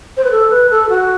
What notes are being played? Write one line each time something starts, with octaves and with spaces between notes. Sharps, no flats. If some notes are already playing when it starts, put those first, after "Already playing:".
C5
B4
A4
B4
A4
F#4